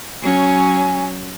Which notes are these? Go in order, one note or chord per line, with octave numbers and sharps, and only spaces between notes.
F#3 C#4 G#5